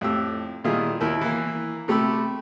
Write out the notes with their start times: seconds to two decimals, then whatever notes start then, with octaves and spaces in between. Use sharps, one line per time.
0.01 F2 A2 G4 E6
0.64 A#2 D#3 G3 E4 F4 G#4
1.00 D#2 E4 A#4
1.21 E3 A#3
1.88 C3 A3 G4 B5 E6